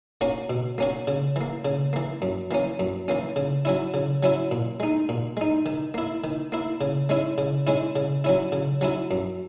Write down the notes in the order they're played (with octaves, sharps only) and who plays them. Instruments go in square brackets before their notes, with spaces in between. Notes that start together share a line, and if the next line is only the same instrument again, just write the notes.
[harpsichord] A#3 C#4 F#4
B2
A#3 C#4 F#4
C#3
E3 A#3
C#3
E3 A#3
F#2
E3 A#3 C#4
F#2
E3 A#3 C#4
C#3
F#3 C#4 E4
C#3
F#3 C#4 E4
A#2
G#3 D#4
A#2
G#3 D#4
D#3
A#3 E4
D#3
A#3 E4
C#3
G#3 C#4 E4
C#3
G#3 C#4 E4
C#3
F#3 C#4 E4
C#3
F#3 C#4 E4
F#2